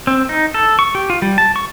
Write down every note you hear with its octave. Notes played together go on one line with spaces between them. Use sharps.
C4
D#4
A4
C#6
G4
F4
G3
A5
C#6